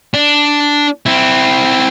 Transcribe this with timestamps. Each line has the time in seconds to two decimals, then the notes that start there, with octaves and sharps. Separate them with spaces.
0.14 D4
1.06 C4 E4